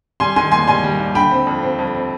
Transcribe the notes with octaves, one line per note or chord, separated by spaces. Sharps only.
G3 G#5 C6
D#3 G#5 C6
D#2 G#5 C6
G3 G#5 C6
G3
D#2
D3 G5 B5
C4
F2
C4
F2
C4